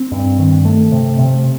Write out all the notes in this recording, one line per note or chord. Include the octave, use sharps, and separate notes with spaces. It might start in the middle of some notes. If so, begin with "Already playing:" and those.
Already playing: C4
G2
D#3
A3
C3
C3